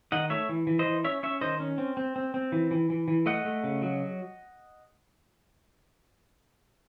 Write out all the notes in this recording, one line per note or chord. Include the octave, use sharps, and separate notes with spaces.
D#3 D#5 F#5
A3 C#5 E5
E3
E3
C5 D#5
E3
C#4 C#5 E5
C#4 C#5 E5
D#3 C5 D#5
C#4
C4
C4
C4
C4
E3
E3
E3
E3
A3 D#5 F#5
A3
C#3
F#3